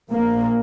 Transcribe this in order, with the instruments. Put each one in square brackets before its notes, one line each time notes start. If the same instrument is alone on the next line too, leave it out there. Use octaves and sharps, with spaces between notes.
[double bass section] A#1 A#2 A#3